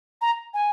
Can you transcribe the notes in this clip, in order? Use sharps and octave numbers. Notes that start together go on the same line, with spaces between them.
A#5
G#5